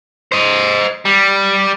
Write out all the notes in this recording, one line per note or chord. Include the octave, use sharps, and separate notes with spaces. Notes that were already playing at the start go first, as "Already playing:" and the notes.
C5 D#5
G3